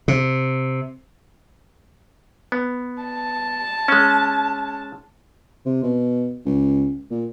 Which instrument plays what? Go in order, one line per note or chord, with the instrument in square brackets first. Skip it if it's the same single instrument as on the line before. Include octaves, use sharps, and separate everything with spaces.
[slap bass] C3
[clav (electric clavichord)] B3
[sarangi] A5
[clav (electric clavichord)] G#3 C#4
[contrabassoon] C3
B2
C#2
A#2